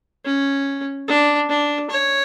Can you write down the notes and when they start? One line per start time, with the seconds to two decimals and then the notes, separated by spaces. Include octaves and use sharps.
0.25 C#4
1.08 D4
1.49 D4
1.90 C#5